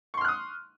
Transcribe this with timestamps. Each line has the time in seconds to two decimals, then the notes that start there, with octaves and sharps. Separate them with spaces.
0.14 C#6
0.17 C6
0.21 F6
0.25 F#6
0.28 D#6